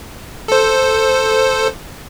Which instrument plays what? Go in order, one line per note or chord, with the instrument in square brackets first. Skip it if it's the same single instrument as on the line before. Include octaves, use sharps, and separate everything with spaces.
[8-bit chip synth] A4 C5